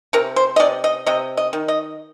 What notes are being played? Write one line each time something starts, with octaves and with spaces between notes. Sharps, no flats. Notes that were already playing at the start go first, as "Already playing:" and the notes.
C3 A#4
C5
D#5
C3 D5
D#5
C3 D#5
D#5
D#3
D#5